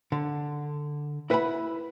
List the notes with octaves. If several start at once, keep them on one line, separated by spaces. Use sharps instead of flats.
D3
E4 B4 F#5 G#5 B5